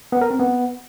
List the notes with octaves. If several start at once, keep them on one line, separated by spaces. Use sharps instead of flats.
B3
A#4
C4
B3